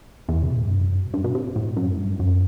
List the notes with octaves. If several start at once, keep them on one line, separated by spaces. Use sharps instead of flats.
E2
C3
B2
A2
G2
F#2
G2
B2
C3
A2
F#2
A2
G2
F#2